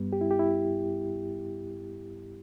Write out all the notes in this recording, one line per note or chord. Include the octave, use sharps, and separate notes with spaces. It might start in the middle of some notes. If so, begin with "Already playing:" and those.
Already playing: G2 G3 B3
G4
E4
G4
E4